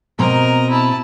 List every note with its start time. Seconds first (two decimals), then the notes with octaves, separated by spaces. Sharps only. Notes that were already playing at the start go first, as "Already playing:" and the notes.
0.19 B2 C4 A#4 D#5 A#5
0.70 E4 A5